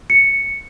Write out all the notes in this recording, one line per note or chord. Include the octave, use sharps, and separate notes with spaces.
C#7